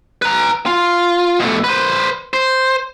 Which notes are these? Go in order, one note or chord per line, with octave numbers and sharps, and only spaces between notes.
B4 A#5
F4
B2 A3
B4 C5
C5